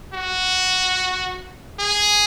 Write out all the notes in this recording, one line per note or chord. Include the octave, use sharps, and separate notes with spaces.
F#4
G#4